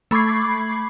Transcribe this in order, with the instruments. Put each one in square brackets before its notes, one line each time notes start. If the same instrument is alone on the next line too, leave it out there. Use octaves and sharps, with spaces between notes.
[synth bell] A3 B5 C#6 D6 G#6 C7